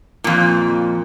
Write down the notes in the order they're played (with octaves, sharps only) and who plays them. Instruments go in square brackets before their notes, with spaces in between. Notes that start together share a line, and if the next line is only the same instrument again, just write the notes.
[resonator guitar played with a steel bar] F2 A#2